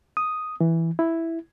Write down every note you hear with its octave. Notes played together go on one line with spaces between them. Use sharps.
D#6
E3
E4